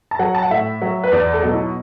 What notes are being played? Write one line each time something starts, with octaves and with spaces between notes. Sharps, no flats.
A5
F#3 F#5
A5
F#5
A2 E5
F#3
B4
E2 D5
A4
B2 F#3
E4